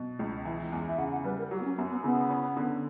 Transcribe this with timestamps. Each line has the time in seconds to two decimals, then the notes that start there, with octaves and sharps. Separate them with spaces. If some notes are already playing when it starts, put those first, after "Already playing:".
Already playing: B2
0.19 C#2
0.45 E3
0.72 E2
0.88 E5
0.98 C#3 F#5
1.12 F#5
1.24 G3 B4
1.38 A#4
1.51 F#3 G4
1.60 B3
1.65 C#4
1.78 F#2 B3
1.91 B3
2.04 C#3 B3
2.30 C#4
2.57 D3